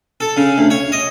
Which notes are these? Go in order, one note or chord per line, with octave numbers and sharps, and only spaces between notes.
A4
C#3
D2
C#5
D#5